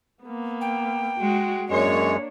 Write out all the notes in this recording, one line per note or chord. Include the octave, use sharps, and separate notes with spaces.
A#3 B3
G5
G#3 F#4
F#2 G#3 A#3 D4 C#5